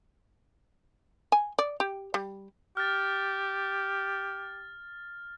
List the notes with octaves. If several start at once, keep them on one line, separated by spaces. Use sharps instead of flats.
G#5
D5
G4
G3
G4 F6 A6